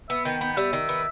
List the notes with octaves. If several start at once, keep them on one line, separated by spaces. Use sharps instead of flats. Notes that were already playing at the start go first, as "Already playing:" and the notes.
B3 E5
D#3 G5
B3 G5
G5
G3 E5
D#3
B3